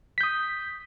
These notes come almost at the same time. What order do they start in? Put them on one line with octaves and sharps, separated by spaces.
B6 G6 D#6